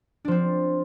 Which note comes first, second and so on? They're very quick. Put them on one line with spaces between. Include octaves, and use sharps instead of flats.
D4 F3 C4